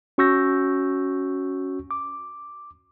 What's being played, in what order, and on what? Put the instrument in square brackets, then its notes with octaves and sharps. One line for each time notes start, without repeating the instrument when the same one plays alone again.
[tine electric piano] C#4 F#4 C#6 E6 G6 A#6
D6